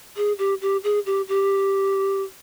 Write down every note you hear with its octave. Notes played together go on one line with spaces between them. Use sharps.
G#4
G4
G4
G#4
G4
G4